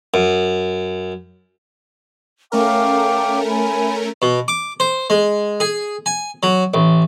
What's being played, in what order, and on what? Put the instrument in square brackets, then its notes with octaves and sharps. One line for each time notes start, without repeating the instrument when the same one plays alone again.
[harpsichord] F#2
[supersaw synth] A3 C#4 A#4 [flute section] F5 G5 D6
[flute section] G#5 B5
[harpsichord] B2
D6
C5
G#3
G#4
G#5
F#3
A1